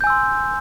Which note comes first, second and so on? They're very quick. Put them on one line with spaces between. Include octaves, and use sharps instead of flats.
G6 G#5 E6 C6